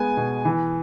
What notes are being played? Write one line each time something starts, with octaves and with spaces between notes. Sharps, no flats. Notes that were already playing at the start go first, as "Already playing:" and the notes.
Already playing: G#3 B3 G#5
B2
E3